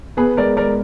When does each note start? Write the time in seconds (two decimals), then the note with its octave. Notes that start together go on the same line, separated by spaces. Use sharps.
0.17 B3 G#4 B4
0.37 G#3 A#4 D5
0.57 G#3 A#4 D5